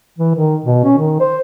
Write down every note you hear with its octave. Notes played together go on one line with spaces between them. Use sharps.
E3
D#3
B2
C#4
D#3
C5